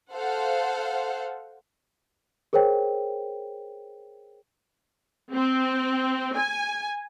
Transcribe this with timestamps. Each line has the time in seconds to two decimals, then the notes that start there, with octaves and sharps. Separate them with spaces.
0.12 A4 C5 F5 F#5
2.53 G#4 A#4 C5 C#5 G5
5.34 C4
6.37 G#5